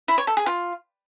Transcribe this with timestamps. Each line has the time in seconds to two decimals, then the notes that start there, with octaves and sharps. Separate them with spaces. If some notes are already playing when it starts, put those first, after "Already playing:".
0.08 E4
0.18 C#5
0.27 A4
0.37 G#4
0.46 F4